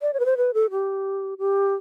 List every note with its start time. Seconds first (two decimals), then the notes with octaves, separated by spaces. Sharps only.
0.02 D5
0.14 C#5
0.20 B4
0.25 C5
0.37 B4
0.54 A4
0.71 G4
1.39 G4